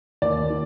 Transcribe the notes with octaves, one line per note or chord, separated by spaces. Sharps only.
D#2 D5
D#3